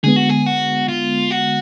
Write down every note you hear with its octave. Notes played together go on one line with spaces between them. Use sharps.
D3 G#3 B3 G#4
F#4
G#4
F#4
F4
F#4